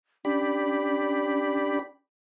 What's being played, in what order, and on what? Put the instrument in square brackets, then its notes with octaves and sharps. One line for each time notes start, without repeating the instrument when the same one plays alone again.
[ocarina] C#4 [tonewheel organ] D4 G4 B5